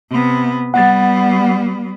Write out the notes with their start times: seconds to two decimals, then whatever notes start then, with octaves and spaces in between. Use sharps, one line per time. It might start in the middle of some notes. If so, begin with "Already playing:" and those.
0.10 C3 B3
0.74 G3 B3 F#5 A6